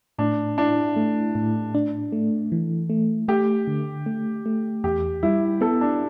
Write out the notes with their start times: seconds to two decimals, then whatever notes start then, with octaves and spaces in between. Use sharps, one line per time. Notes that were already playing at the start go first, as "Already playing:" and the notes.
0.19 A2 D4
0.58 D4 E4
0.96 A3
1.35 A2
1.75 D4
2.12 A3
2.52 E3
2.90 A3
3.28 A3 G4
3.67 D3
4.06 A3
4.46 A3
4.84 E2 G4
5.23 G3 E4
5.61 B3 A4
5.81 D4